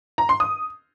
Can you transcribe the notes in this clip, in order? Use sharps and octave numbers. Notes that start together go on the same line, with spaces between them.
A#5
C6
D#6